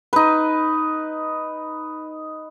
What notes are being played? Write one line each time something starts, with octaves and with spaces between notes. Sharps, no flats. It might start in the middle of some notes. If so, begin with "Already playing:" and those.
D#4 B4